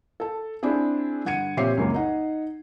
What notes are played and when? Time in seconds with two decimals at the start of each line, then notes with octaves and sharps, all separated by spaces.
0.20 A4 A5
0.63 C4 D4 E4 G#4
1.25 G2 D3 F#5 G#6 C#7 D#7
1.57 A#2 C4 G4 C#5 E5 C7
1.77 C#2 F#2 A#3
1.94 D#4 F#5